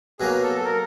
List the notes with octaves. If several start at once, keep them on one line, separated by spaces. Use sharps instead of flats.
B2 F#3 A#3 G#4
A4
A4
A#4